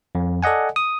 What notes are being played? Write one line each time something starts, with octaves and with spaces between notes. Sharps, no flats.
F2
A4 D5 D#5 F#5 G#5
D#6